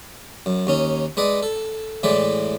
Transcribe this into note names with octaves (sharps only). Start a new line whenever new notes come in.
F#2
D#2 C#4 D#4
G#3 B4 D5 D#5
A4
A2 E3 G#3 B4 D5